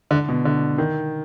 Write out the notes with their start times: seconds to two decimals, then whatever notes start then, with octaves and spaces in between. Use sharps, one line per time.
0.11 D3
0.29 B2
0.45 D3
0.78 D#3